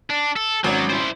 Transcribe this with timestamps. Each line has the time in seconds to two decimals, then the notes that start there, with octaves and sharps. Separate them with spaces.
0.10 D4
0.36 A4
0.64 G#1 F#3 C#4
0.90 E4 C5